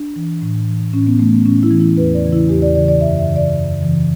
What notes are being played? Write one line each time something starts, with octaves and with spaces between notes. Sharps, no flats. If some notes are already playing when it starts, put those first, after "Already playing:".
Already playing: D4
E3
A2
E3
A2 C#4
B3
E3 A3
B3
A2 C#4
E4
E3
E4
E2 B4
D5
C#3 E3
E4
E2 G4
D5
C#3 E3 D5
D5
F#2 E5
E5
C#3 E3
D5
F#2
C#3 E3